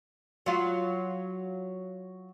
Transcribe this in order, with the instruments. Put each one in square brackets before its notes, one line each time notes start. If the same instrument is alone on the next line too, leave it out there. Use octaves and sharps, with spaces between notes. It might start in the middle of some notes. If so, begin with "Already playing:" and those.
[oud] F#3 F4